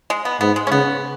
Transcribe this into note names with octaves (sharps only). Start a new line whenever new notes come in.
G#3
B3
G#2 B3
G#3
C#4
C#3 B3